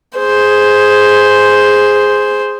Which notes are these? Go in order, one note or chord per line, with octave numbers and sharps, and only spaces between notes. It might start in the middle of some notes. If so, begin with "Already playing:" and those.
G#4 C5